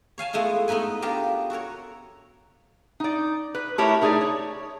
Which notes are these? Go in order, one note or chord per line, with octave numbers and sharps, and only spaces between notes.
C#5 F5 G#5 A5
G#3 A3 B3 E4 F4
A3 B3 D#4 B4 G#5
B3 D4 F4 G4 A#4
F#4 A4 A#4 C#5
D#4 D5
B4
A3 E4 G4 A#4 C#5
A3 D#4 G#4 D5
C#5